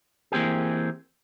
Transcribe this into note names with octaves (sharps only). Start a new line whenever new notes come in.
E3 A#3 C4 G4 G#4